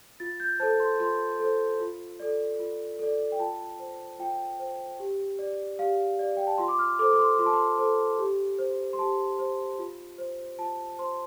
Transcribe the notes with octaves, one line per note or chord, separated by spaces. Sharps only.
F4 A6
G6
A4 C5 A5
C6
F4 C6
A4 C5
F4
A4 D5
F4
A4 D5
G5
F4 A5
C5
F4 G5
C5
G4
D5
G4 F5
D5
G5
A5
F4 C6
D6
F6
A4 C5 D6
D6
C6
F4 C6
A5
C6
A4 C5
G4
C5
C6
G4 A5
C5
F4
C5
F4 A5
C5 C6